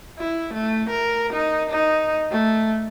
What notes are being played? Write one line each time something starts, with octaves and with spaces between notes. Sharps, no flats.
E4
A3
A#4
D#4
D#4
A3